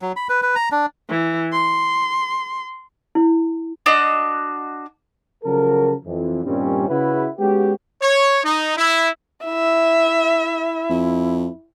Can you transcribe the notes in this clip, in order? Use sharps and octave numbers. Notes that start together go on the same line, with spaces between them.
F#3
B5
B4
B4
A#5
D4
E3
C6
E4
D4 F#4 D#5
C#3 F3 F#3 A4 A#4
F2 E3
G2 A#2 D#3 G3 C4 C#4
C#3 E4 F#4 B4
G#3 B3 C#4 F#4 G4
C#5
D#4
E4
E4 E5
F2